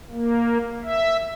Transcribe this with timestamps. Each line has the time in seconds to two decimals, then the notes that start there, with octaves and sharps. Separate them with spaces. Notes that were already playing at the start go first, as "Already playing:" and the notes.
0.10 A#3
0.83 E5